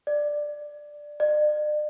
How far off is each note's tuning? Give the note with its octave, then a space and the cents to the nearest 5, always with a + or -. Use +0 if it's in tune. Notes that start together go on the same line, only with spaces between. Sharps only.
D5 +10
D5 +40